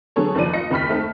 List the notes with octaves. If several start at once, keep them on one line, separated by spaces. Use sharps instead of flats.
D3 F#3 B3 G#4 A4 C#5
F#1 D#3 F3 D5 D#7
F4 D#5 A#6 C#7
F#1 D#2 B5 F6 B6
A3 C4 D#4 A4